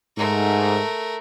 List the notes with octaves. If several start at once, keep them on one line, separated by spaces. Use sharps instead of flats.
G#2 A3 A#4